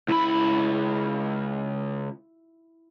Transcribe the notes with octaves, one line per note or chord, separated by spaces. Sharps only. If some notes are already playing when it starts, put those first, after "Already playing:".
C#2 E4 B5